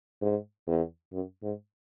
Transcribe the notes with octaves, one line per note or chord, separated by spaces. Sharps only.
G#2
E2
F#2
G#2